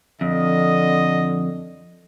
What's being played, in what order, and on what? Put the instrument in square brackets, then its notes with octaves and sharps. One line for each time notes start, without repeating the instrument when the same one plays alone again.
[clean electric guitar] F2 [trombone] D3 [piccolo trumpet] D#5